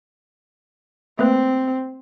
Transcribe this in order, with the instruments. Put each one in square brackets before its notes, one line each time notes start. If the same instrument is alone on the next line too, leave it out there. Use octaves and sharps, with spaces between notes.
[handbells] A3 A#3 B4 [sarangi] C4